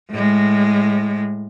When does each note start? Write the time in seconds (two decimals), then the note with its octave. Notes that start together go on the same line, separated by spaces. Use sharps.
0.11 A2 G#3